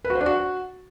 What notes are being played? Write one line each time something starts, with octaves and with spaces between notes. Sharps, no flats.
B4
F#4
C5
D4
F#4